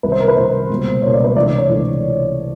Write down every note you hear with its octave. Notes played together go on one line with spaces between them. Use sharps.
C2 C3 D#3 B4
C5
A#4
B4
C2 C3 D#3 C5
C#2 B2 G3 A#3
C#2 B2 G3 A#3 C#5
D5
B4
C#2 C3 E3 A3 D4 D5
D5
C#5
C#2 C3 E3 A3 D4